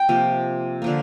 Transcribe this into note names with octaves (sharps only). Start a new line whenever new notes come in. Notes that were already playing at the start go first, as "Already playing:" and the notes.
Already playing: G5
C3 F3 A#3
D3 F3 A#3